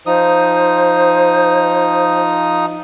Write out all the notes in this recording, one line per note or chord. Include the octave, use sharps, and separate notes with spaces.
F3 D#4 C5 D#6